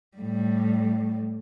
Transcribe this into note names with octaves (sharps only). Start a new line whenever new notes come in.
A2 G3